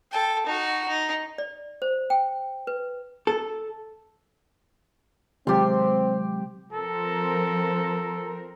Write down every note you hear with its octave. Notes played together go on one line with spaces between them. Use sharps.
A4 G5
D#4 F#4
D#4
D5
C5
G5
B4
A4
C3 D#3 F#3 G#3 C4 G4 C6
F3 C4 A4 A#4